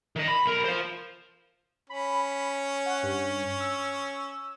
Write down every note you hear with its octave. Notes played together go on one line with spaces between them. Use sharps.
D#3 D#5
B5
B1 A#4
C5 F5
C#4 B5
F#5
G2
E6